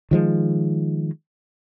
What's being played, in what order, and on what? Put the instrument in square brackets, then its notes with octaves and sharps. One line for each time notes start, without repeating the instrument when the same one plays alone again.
[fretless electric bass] D#3 F3 G#3